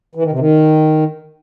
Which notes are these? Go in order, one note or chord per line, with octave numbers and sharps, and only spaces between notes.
E3
D#3
C3
D#3